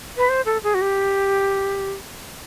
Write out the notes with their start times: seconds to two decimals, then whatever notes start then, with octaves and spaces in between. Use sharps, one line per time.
0.17 B4
0.29 C5
0.46 A4
0.63 G#4
0.74 F#4
0.81 G4